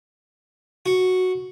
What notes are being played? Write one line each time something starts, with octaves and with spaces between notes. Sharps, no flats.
F#4